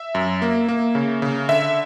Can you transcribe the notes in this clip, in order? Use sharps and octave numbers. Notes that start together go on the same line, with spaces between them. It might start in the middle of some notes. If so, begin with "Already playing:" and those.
Already playing: E5
F#2
A#3
A#3
C#3
C#3
D3 E5